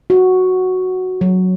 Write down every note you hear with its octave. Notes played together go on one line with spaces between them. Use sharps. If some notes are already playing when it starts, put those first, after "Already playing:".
F#4
F#3